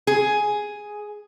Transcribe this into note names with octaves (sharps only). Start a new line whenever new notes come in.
G#4